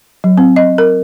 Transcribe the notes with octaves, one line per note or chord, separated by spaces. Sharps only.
F#3
C4
D#5
A#4